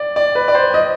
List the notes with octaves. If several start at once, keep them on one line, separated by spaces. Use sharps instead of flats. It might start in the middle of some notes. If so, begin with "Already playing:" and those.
Already playing: D5
D5
B4
D5
C5
D#5